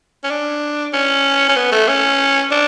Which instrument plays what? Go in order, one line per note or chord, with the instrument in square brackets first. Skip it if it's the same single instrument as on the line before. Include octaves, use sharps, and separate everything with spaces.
[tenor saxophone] C#4
D4
C#4
C#4
B3
A3
C#4
D4